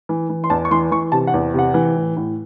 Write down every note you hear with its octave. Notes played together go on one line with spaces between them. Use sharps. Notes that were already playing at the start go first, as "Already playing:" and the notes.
E3
E3
C6
E2 A5
C#6
E3 C6
E3 C#6
C3 A5
F#5
E2
C3 F#5
E3
A2
A2